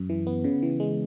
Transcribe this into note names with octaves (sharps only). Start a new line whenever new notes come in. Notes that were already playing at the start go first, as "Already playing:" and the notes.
Already playing: F#2
E3
B3
C#3
E3
G#3